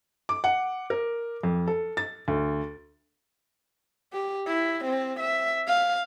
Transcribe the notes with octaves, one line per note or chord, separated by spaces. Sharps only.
D6
F#5
A#4
F2
A4
A6
D2
G4
E4
C4
E5
F5